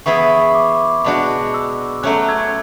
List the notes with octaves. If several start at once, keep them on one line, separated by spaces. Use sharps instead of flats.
E3 B3 E4 G#4 C#6
B5
C#6
D6
B2 G#3 D4 F#4
E6
F#3 A3 C#4 F#6
E6 G#6